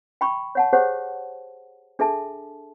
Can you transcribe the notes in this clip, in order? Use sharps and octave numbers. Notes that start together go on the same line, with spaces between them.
G5 B5 C#6
C#5 F#5 A5
G4 G#4 C5 C#5 F#5
D4 G#4 A4 E5 A5